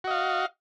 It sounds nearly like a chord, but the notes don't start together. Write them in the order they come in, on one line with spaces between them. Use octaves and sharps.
F#4 D#5 F5